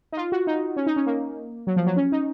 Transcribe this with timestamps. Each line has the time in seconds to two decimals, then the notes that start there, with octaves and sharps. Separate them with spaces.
0.12 D#4
0.17 F4
0.32 F#4
0.47 D#4
0.76 C#4
0.87 D#4
0.96 C#4
1.07 A#3
1.67 F#3
1.76 F3
1.87 F#3
1.97 C#4
2.12 D#4